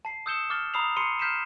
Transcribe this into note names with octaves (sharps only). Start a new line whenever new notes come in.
A5 C7
D#6 E6 G6 C#7 E7 G7
D6 F6 A6 G7
A#5 B5 D#6 E6 C7 F7
B5 C6 C7 C#7 D#7 G7
F6 G6 B6 C7 D#7 E7